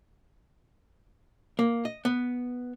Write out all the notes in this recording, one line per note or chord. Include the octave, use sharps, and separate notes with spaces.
A#3
D#5
B3